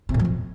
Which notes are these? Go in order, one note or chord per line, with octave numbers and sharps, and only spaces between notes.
C3
A2
F3
F2